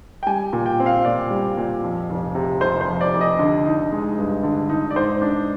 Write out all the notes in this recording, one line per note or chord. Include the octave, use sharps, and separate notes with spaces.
G5
G3 G#5
A#2
G5
C4
F5
A#2 D5
G3
A#2
F2
F1
C3
F1 C5
C5
F2
D5
F1
D#5
D3
D#4
G#3
G2
D3
D#4
D5
G#2 C5
D4